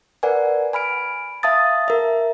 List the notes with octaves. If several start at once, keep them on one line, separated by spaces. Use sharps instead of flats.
A#4 B4 D5 F#5 G#5
G#5 B5 F6 D7
E5 F5 A5 D#6 A6
A#4 E5